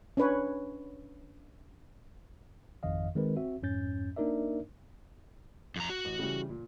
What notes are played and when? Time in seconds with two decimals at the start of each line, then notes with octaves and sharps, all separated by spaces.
0.17 C#4 D4 B4 C#5
2.83 G#1 F2 D#3 D#5 F5
3.16 D#3 G#3 C4 A#4 B4
3.36 C4 F#4 E5
3.62 F2 G#2 C#4 G6 A6
4.16 A#3 D4 D#4 A#4 D5 E5
5.76 F2 A#5
5.90 F#4
6.05 A1
6.19 C#3 E3 G3
6.49 A#2